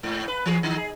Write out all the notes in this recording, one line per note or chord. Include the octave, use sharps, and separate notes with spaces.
G#2
B4
E3 G#4
D#3 D#4
G#4